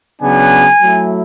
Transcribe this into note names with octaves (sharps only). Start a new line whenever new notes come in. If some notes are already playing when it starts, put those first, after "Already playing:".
C#3 F#3 B3 D4 G#5
F#3 A3 E4